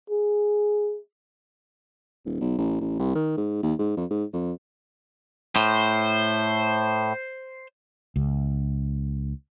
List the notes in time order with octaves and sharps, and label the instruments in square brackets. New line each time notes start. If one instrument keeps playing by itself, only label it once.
[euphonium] G#4
[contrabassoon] D#1
B1
A1
A1
C2
D#3
G#2
D#2
G#2
F2
G#2
F2
[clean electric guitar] A2 [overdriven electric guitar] C5
[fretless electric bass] C#2